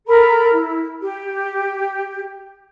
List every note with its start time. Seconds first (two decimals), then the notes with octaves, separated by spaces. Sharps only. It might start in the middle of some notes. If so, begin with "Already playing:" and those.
0.07 A4 A#4 A#5 B5
0.52 E4
1.01 G4